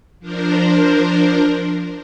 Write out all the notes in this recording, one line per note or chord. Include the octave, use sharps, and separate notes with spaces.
F3 D4 A#4 C5